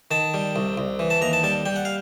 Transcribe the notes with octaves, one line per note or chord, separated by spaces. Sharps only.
D#3 A5
G3
C2
C2
E3
A5
D#2 A#5
A5
G3 A5
G3 G5
F#5
F5